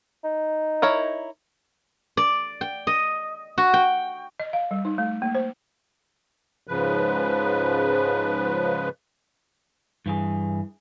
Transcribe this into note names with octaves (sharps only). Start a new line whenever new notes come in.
D#4
E4 A#4 C#5
D5
G5
D#5
F#4
G5
D#5
F5
G3
D#4
A3
A#3
C5
G#2 C#3 F3 B4
G2 E3 G#4